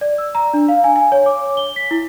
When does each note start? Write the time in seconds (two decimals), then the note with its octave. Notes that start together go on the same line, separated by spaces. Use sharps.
0.01 D5
0.18 E6
0.35 A#5
0.54 D4
0.68 F5
0.84 G#5
0.96 G#5
1.12 C#5
1.26 D6
1.57 G7
1.76 B6
1.91 E4